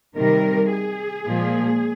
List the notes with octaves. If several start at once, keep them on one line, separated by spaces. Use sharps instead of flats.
C3 D#3 G3 A#4
G#4
A#2 F3 G#3